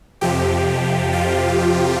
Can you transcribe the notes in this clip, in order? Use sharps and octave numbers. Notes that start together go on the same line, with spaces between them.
F2 C3 F3 G4
F4